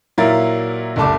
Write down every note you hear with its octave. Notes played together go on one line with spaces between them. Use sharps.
A#2 F#3 E4 A#4 F5 A6
F#1 C2 A3 A5 D6